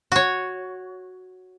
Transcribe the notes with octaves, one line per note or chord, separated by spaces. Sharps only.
F#4 C#5